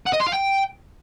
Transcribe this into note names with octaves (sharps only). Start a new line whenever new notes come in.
F#5
D#5
C6
F5
G5